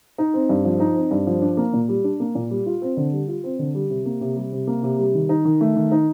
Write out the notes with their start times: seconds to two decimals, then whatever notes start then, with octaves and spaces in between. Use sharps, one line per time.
0.18 D#4
0.34 C4
0.49 G2
0.65 F3
0.80 D#4
0.96 C4
1.11 G2
1.27 F3
1.42 D4
1.57 A#3
1.73 A#2
1.89 G3
2.04 D4
2.20 A#3
2.35 A#2
2.51 G3
2.66 F4
2.82 C4
2.97 D3
3.12 G3
3.28 F4
3.44 C4
3.59 D3
3.75 G3
3.90 C3
4.05 A#3
4.21 C3
4.37 G3
4.52 C3
4.67 A#3
4.83 C3
4.99 G3
5.14 D#3
5.29 D#4
5.45 D#3
5.61 A3
5.76 D#3
5.92 D#4